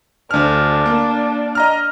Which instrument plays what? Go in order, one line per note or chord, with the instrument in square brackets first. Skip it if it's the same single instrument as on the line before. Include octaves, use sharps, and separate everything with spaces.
[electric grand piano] D2 F6 [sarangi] D4
[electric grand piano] A#3
D#5 A#5 F6